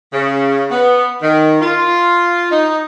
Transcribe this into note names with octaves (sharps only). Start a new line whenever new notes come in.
C#3
B3
D#3
F4
D#4